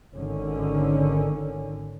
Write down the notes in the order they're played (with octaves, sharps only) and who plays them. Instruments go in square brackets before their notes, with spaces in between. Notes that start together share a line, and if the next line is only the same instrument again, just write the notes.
[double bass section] G#1 D3 D#3 C#4